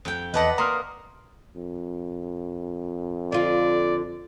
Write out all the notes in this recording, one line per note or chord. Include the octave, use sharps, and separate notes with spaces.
F2 G5
E2 B4 D5 D#5 F#5 A5
A#3 A#5 C6 D#6 F6
F2
D3 F4 D5